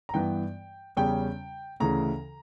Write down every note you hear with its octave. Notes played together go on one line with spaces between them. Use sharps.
A#5
G2 E3 B3 G5
E2 C#3 G3 C#4 G5
D2 C#3 E3 A#5